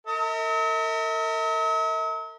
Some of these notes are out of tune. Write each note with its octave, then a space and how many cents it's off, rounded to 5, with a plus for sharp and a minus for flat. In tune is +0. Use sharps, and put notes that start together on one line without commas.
A#4 -40 E5 -45